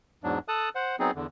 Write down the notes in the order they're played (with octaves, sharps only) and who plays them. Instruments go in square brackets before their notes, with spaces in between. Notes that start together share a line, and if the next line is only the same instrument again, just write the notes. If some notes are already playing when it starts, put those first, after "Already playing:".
[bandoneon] E2 G#2 F#3 D4
A4 A5 D#6 F#6
C5 F#5
F#3 B3 C4 D#4 G#4
E2 D3